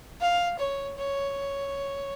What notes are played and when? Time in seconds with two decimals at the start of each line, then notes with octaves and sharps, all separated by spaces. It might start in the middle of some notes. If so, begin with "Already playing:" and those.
0.21 F5
0.59 C#5
0.98 C#5